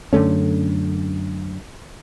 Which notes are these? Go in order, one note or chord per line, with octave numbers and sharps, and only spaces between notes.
F#2 D3 A3 C#4